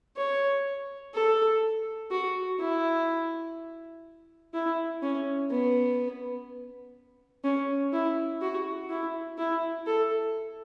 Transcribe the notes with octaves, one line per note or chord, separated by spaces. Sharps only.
C#5
A4
F#4
E4
E4
C#4
B3
C#4
E4
F#4
E4
E4
A4